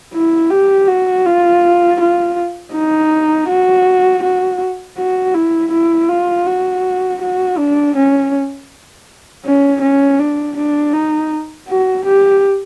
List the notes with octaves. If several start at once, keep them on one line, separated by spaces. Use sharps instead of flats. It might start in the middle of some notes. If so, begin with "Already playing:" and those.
E4
G4
F#4
F4
F4
D#4
F#4
F#4
F#4
E4
E4
F4
F#4
F#4
D4
C#4
C#4
C#4
D4
D4
D#4
F#4
G4